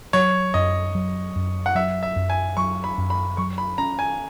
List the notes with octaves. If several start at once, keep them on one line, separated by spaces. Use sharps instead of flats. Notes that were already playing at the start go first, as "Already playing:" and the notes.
F#3 C#5
F#2 D#5
F#3
F#2
F#5
F#3 E5
E5
F#2
G#5
F#3 C#6
B5
F#2
B5
F#3 C#6
B5
C#4 A#5
G#5